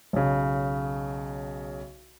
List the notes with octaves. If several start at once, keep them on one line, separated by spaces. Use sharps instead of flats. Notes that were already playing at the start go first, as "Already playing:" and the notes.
B1 C#3